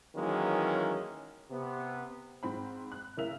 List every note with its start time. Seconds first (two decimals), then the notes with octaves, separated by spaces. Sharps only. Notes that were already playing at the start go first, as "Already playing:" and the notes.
0.16 D#3 E3 F#3 G#3 A#3 C#4
1.50 C3 B3
2.43 G#2 C4 B5
2.92 F#6
3.17 A2 C#3 A#3 A#4 E5 F7